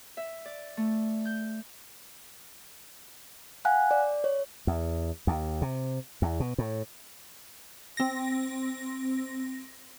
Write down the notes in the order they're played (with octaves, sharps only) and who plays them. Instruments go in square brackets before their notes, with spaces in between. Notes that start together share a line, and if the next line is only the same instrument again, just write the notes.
[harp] E5
D5
A3
G6
[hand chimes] F5 F#5 G#5 F#6
D5
C#5
[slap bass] E2
D#2
C3
E2
B2
A2
[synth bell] C4 A#6